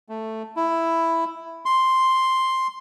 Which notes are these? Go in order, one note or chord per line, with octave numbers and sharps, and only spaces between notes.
A3
E4
C6